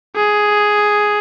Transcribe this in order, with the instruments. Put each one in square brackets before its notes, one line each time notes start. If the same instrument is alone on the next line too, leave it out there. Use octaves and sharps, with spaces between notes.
[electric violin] G#4